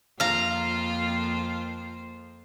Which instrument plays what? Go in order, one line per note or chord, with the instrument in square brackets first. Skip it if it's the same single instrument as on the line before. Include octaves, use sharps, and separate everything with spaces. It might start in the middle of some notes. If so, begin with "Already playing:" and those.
[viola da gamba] F2 A#3 C5 [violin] F4 [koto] F5 A#5